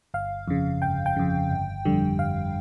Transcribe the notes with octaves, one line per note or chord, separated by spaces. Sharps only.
G1 F5
F2 C#3
G1 G5
G5
F2 C#3
G1
F2 D3 G3
G1 F5